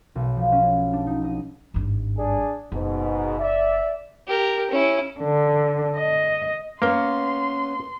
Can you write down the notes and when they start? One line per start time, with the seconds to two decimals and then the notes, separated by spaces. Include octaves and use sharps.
0.15 B1
0.36 F3
0.52 C#4
0.93 D4
1.07 D#4
1.24 D#5
1.74 G#1 G2
2.18 D4 G#4 D5
2.72 F#1 G#2 B2
3.39 D5 E5
4.28 G4 A#4
4.70 C#4 E4
5.20 D3
5.97 D#5
6.82 A#3 B3 C#4 B4 C6